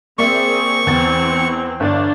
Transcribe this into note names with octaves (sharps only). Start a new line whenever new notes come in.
A#3 C4 G#4 D5 E5 C#6
E2 E3 C4 A6
G1 D4